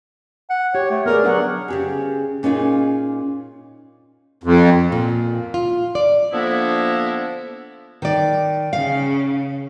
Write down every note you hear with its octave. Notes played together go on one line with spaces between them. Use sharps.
F#5
G4 C#5
A3
B3 G#4 A#4 D5
F#3 D4 C#5 F#5
C#3 G4 G#4
A#2 C#4 D#4 F4 G#4
F2
A#2
F4
D5
D3 F3 A#3 B3 D4 E4
D#3 D5
C#3 F5